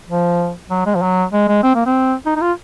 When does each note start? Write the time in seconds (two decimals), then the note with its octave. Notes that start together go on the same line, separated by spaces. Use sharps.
0.08 F3
0.70 F#3
0.86 G#3
0.95 F3
1.02 F#3
1.33 G#3
1.48 G#3
1.63 C4
1.75 A#3
1.86 C4
2.26 D#4
2.36 D#4
2.41 F4